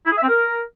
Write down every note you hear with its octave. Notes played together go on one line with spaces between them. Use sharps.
E4
G#4
E5
C4
A#4